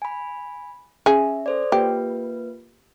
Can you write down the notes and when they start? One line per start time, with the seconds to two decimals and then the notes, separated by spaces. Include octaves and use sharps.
0.02 G#5 B5
1.06 C#4 G#4 E5
1.46 A4 C5 D5
1.72 A#3 F4 G4 B4